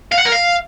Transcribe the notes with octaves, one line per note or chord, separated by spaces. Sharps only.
F5
F#5
A#4
F5